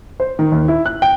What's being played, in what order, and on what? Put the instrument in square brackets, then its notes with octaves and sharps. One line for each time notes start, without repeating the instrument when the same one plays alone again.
[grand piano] C5
D#3
D#2
E4
F#6
G5